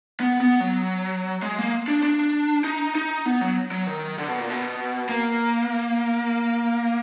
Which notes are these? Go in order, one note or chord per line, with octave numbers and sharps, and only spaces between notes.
B3
B3
F#3
G#3
A#3
D4
D4
D#4
D#4
B3
F#3
F#3
D#3
D3
B2
A#2
B2
A#3